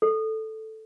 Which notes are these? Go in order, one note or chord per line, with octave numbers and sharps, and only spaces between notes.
A4